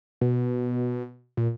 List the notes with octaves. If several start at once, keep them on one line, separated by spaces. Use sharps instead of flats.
B2
A#2